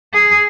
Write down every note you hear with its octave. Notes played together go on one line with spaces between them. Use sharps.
G#4